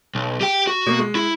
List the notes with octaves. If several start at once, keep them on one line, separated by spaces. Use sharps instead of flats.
B1
G4 G5
F#4
B2 A#3
G#3
E4